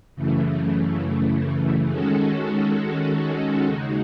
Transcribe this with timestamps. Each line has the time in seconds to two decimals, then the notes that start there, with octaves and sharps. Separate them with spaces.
0.15 F#2 C#3 E3 A3
1.91 D#3 G#3 C#4 F#4 A4
3.67 D#2 C#3 G#3 D#4 F#4